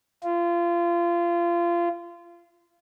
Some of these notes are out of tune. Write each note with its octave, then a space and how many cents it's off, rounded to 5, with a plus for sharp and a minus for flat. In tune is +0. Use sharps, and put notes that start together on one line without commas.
F4 -25